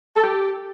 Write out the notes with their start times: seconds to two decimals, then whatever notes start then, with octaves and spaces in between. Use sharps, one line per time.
0.16 A4
0.23 G4